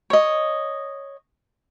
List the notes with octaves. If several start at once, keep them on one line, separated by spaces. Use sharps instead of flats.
C#5 D#5